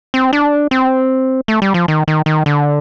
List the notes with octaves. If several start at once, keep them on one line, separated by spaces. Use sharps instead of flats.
C4
D4
C4
A3
G3
F3
D#3
D#3
D#3
D3